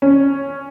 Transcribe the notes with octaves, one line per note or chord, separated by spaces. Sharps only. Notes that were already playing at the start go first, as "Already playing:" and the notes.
C#4